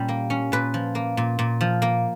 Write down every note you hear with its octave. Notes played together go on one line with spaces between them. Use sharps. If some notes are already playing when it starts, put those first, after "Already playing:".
Already playing: A#2 G3 C#4
A#3
C#4
A#2 B4
F3
A#3
A#2
A#2
F3
A#3